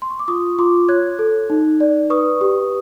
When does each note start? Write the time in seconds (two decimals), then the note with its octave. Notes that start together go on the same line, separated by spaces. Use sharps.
0.02 C6
0.10 C#6
0.19 D6
0.28 F4 C#6 D#6
0.59 F4 C6 D6
0.89 C#5 F#6 G#6
1.19 A4
1.50 D#4
1.80 D5
2.10 B4 C#6 D#6
2.41 G4